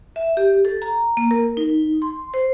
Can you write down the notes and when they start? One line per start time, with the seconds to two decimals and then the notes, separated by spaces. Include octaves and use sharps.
0.16 E5
0.37 G4
0.65 A4
0.82 A#5
1.17 A#3
1.31 A#4
1.57 D#4
2.02 C6
2.34 C5